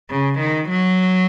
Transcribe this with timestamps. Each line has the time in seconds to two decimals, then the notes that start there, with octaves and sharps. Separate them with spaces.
0.10 C#3
0.39 D#3
0.70 F#3